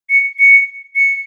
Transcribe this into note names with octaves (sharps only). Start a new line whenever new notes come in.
C#7
C#7
C#7